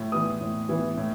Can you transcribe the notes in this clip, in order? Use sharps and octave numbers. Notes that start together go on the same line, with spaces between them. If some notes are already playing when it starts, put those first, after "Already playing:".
Already playing: A2
E3 B3 D#6
A2
E3 B3
A2